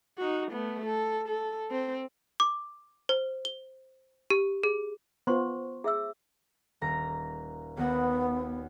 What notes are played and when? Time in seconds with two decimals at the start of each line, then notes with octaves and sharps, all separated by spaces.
0.18 D#4 F#4
0.52 A3 B3
0.86 A4
1.28 A4
1.71 C4
2.40 D6
3.09 C5
3.45 G7
4.30 G4
4.64 G#4
5.27 B3 F4 C5 C6 C#6
5.84 G#4 E5 E6
6.81 D#1 A#5 A#6
7.77 D#2 B3 F#4 F#5